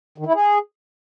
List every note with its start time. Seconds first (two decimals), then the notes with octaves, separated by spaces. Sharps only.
0.18 D#3
0.26 E4
0.35 G#4